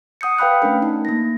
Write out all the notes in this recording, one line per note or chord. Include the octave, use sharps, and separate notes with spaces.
F#5 D#6 G6 C#7
B4 F5 G5 B5 F#6
A3 C#4 D4 A#4
D#4
A#3 A#6